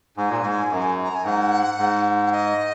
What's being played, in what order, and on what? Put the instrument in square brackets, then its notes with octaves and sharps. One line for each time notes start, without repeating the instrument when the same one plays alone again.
[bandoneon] G#2 [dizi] G#5
[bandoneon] A#2
G#2
F#2
[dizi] A#5
G#5
[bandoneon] G#2 [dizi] F#5
[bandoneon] G#2
[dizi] F#5
D#5